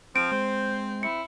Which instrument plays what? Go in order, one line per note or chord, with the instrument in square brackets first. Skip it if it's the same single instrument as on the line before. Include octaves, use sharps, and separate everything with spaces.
[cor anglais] F3 [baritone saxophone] C4 [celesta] D7
[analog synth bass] G#3 [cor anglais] C5
[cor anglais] E4 [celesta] C#7